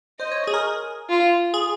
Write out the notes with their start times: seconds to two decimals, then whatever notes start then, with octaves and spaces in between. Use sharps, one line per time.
0.20 C5 D#5
0.32 C#5
0.47 G#4
0.54 A#4
1.09 F4
1.54 G#4